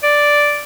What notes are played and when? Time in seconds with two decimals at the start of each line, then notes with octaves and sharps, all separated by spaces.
0.03 D5